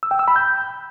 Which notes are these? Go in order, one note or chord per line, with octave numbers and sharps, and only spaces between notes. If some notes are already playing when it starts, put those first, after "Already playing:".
E6
G5
E6
B5
G6